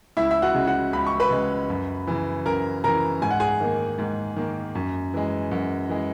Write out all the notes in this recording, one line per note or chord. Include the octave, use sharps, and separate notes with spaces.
C#2 E4 E5
E5
F#4 F#5
C#3 G#3
F#4 F#5
C#2 B5
C#6
B4 B5
C#3 G#3
F#2
C#3 E3
F#2 A#4 A#5
C#3 E3 A#4 A#5
G#2 G#5
F#5
G#4 G#5
D#3 A#3
G#2
D#3 A#3
F#2
E3 G#3
F#2
E3 G#3